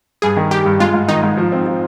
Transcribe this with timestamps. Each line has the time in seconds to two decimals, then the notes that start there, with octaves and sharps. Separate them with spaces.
0.22 G2 G#4
0.37 D#3
0.51 G3 G4
0.66 G2
0.80 G#3 F4
0.94 G#2
1.08 D#3 D#4
1.23 G#2
1.37 F3
1.52 C4
1.66 F3